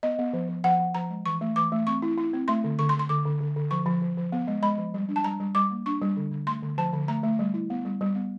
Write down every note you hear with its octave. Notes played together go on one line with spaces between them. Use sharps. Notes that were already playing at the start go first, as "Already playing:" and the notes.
B3 D#5
B3
F3
F3
F3 F#5
F3
F3 A#5
G#3
E3 C#6
A3
E3 D6
A3
C4 C#6
E4
E4
C4
A3 C6
D3
D3 C#6
C6
D3
C6
D3 D6
D3
D3
D3
F3 C#6
F3
F3
F3
B3
G#3
G#3 B5
F3
G3
D4
A5
G3 A#5
G3
G3 D6
A#3
D4 C#6
G3
D3
D3
A3 C6
D3
F3 A5
D3
A3 A#5
A3
G3
E4
B3
G3
G3
B3